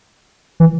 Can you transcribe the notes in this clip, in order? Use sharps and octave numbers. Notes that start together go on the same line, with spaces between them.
E3